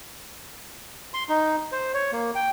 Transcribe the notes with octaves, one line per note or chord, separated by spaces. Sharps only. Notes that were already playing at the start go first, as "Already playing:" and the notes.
C6
D#4
C5
C#5
A#3
G5